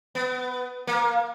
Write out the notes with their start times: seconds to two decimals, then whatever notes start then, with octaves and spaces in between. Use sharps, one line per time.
0.15 B3
0.87 A#3